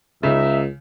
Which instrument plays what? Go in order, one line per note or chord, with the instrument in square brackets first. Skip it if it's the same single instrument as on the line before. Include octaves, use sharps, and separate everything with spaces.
[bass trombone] C#2 [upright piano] C#3 [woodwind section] D#4 E5